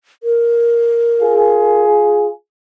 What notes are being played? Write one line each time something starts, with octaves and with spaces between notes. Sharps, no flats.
A#4
F4 G#4